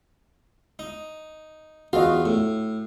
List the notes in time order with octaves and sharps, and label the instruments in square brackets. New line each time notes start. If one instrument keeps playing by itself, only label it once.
[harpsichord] D#4
[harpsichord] E2 F4 F5 [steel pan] F#4 D#5
[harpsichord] A2